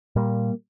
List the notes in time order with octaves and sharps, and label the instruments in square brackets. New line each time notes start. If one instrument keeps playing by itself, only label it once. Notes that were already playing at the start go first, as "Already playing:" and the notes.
[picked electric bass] A#2 G3 A#3